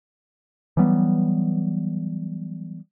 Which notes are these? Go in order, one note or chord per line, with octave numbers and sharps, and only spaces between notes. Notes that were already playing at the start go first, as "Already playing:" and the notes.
E3 F#3 G3 B3